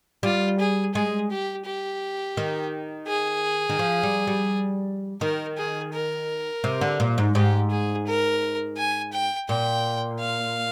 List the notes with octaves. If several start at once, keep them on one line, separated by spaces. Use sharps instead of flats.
G3 F4
G#4
G#3 G#4
G4
G4
D#3
G#4
D#3
F3
G3
G3
D#3 A#4
G#4
A#4
C3
D3
A#2
G#2
G#2 G4
G#4
A#4
G#5
G5
A#2 G5
F5